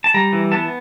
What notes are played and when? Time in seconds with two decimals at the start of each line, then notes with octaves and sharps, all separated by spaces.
0.04 A5
0.14 G3 A#5
0.33 E3
0.52 B3 A5